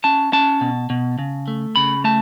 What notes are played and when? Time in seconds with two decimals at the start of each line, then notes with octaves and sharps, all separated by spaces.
0.04 C#4 A5
0.33 C#4 A5
0.61 B2
0.90 B2
1.19 C#3
1.48 A3
1.76 C#3 B5
2.04 A3 A5